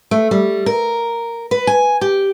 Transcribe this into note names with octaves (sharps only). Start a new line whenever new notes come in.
A3
G3
A#4
B4
G#5
G4